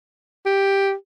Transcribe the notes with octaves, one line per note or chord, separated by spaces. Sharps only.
G4